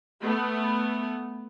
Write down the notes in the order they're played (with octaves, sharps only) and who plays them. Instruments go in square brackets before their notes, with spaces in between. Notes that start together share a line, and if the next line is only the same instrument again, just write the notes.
[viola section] A3 B3